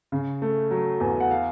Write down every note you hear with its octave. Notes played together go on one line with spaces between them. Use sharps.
C#3
A3
F#3
E2
F#5
F5